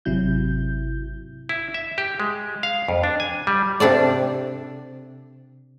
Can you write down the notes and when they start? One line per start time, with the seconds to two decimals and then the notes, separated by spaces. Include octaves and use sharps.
0.05 G#1 C3 F#3 E4 G6
1.49 E4
1.74 E5
1.98 G4
2.20 G#3
2.63 F5
2.88 F2
3.04 D4
3.20 G#5
3.47 G3
3.80 C3 D4 A4 D5